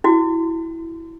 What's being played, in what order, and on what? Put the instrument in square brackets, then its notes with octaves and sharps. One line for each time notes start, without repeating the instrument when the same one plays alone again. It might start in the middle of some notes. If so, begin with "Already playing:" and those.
[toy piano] E4 F#4